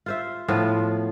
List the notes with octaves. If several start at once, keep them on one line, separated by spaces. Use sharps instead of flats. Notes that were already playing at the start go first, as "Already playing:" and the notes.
F4 C5 E5
A2 F3 B3 F4